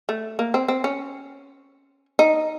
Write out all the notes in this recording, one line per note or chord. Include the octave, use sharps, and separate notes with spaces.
A3
A#3
C4
C4
C#4
D#4